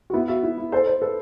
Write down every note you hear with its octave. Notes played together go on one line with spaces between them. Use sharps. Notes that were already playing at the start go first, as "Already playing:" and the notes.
F#4
B3 E4
F#4 E5
E4
E4
A4 C5
C5
A4 B4